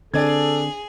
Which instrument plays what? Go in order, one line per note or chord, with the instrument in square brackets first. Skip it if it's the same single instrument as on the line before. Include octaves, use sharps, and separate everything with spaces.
[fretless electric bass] D3 C4 [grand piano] D4 D5 G#6 [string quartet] G#4 [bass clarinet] A4